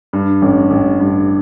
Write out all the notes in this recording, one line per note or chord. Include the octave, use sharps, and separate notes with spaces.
G2
A1
A1
G2